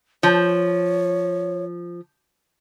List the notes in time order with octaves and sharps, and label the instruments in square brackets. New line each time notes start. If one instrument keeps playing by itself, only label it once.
[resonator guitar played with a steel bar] F3 [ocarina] C#5